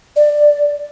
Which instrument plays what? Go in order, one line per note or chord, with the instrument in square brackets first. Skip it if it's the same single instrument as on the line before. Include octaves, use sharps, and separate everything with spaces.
[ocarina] D5